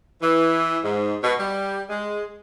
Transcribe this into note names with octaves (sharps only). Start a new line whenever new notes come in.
E3
G#2
B2
G3
G#3